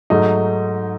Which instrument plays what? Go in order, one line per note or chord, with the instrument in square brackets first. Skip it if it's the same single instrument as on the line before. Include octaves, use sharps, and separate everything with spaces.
[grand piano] G#2 F#3 A3 D#4